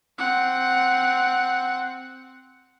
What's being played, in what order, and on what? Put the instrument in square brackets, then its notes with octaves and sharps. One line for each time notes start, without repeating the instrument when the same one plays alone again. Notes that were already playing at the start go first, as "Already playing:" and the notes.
[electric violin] C4 F#5